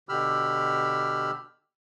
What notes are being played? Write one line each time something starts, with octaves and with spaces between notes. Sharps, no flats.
B2 D3 G4 B5 E6 F6